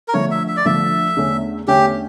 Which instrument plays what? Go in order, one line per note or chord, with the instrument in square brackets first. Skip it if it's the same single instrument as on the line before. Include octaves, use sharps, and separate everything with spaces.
[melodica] A#4
[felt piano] D3 F3 A3 [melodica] C#5
[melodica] E5
E5
D5
[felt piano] D3 F3 A3 [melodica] E5
[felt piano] E2 D3 A3 C#4
[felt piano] E2 D3 A3 C#4 [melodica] G4